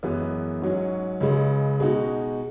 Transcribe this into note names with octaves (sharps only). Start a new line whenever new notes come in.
F#2 E3 G#3 B3
G#2 F#3 C#4
C#2 C#3 G#3
B2 G#3 D#4 F#4